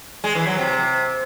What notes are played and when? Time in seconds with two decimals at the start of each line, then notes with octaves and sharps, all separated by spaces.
0.24 G#3
0.35 E3
0.47 F#3
0.58 C3